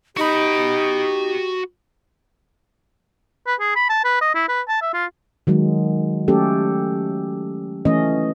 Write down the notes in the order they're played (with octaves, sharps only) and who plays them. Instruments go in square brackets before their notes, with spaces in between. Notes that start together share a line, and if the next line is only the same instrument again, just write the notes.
[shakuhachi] D#4 [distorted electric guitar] F#4 B5 [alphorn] G4
[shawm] B4
G#4
B5
A5
B4
D#5
E4
B4
A5
E5
F4
[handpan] D#3 F#3 G#3
F#3 A3 C#4 G4 A4
E3 A3 C#4 D#5